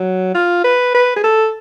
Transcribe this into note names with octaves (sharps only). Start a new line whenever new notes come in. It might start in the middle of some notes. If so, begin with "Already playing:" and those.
Already playing: F#3
F4
B4
B4
G#4
A4